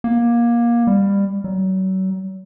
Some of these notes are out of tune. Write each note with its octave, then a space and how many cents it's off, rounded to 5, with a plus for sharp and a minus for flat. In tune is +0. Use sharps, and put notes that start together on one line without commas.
A#3 +20
G3 +20
F#3 +35